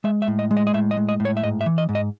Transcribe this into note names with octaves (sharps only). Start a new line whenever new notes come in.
G#3 E5
E5
A2
D#5
G#3
D#5
D#5
A2 E5
D#5
G#3
D#5
A2
C#5
E5
G#2 D#5
E5
E3
D#5
G#2
D#5